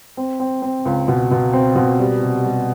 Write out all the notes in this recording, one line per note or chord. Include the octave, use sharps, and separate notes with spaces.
C4
C4
C4
C#2
B2
B2
C4
B2
G3
C3
G3